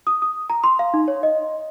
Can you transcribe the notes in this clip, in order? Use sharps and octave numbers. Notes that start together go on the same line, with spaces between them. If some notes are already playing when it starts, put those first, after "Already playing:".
D#6
D#6
A#5
C6
F5
D#4
C#5
D#5